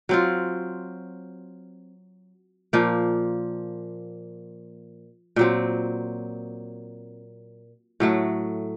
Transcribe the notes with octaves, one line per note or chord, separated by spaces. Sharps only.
F#3 C4 F4
A#2 F3 A#3
A#2 F#3 C4
A2 F#3 A3